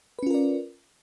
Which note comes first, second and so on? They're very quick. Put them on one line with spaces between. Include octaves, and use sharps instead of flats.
B4 C#4 F4 A#4 D5